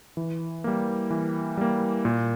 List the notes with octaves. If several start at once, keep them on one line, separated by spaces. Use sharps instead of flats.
E3
G3 A#3
E3
G3 A#3
A#2